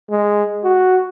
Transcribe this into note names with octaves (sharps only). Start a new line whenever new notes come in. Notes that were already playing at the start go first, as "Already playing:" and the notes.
G#3
F#4